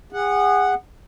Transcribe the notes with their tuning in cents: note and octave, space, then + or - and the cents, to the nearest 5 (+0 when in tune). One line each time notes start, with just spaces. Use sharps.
G#4 -30 F#5 +0